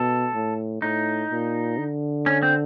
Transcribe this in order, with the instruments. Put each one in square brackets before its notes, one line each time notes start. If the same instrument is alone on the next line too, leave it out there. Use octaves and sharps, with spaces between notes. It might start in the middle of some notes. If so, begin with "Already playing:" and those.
Already playing: [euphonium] B2 [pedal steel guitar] A4
[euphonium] A2
[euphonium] A2 [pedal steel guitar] D#4
[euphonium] A#2
D3
[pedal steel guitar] C#4
C4